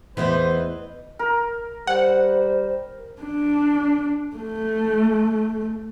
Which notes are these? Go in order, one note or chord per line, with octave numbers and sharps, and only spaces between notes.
E2 E3 B3 E4 B4 C5 D#5
A#4
G3 C5 F#5
D4
A3